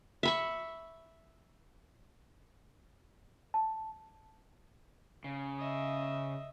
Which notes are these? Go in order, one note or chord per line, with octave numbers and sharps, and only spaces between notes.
E5 B5 C#6
A5
C#3
D#5 E5